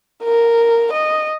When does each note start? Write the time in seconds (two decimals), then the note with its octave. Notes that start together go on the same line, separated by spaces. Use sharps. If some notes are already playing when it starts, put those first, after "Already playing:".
0.23 A#4
0.93 D#5